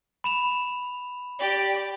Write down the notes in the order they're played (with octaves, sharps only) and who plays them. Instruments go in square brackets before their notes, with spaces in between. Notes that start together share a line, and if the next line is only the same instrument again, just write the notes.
[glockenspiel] B5 E7 F7
[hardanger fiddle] G4 D5